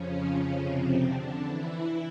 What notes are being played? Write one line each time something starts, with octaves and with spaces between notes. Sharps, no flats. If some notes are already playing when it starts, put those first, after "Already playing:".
Already playing: F2 C#3 F3 C#4
C3 C4
D3 D4
E3 E4